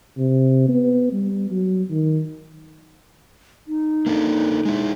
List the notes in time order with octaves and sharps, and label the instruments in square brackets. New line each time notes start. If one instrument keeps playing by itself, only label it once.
[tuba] C3
B3
G3
F#3
D#3
[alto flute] D#4
[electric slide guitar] A#3 D4 A4
G#3 E4